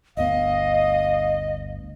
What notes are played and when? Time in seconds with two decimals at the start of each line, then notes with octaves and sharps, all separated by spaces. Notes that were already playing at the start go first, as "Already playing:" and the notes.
0.17 G1 D2 B3 D#5 F5